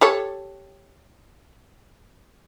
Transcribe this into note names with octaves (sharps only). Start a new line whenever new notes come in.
G4 A4 C#5